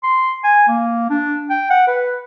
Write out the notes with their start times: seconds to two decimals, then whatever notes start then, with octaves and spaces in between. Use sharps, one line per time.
0.04 C6
0.44 G#5
0.68 A#3
1.10 D4
1.50 G5
1.70 F#5
1.87 B4